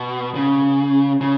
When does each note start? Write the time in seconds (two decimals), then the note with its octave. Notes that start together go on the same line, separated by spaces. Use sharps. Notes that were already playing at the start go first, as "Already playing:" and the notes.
Already playing: B2
0.35 C#3
1.21 C#3